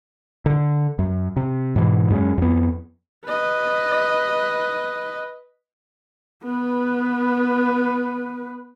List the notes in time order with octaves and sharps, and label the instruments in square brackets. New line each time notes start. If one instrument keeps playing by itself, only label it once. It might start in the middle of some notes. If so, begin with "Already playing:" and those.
[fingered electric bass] D3
F#2
C3
G#2 B2 E3
F#2 G#3 C4 C#4
F2 B3
[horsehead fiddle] B4 D#5
B3 B4